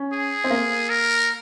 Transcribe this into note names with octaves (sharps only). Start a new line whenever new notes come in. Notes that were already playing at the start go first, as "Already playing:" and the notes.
Already playing: C#4
G#4
C4
A#3
A#4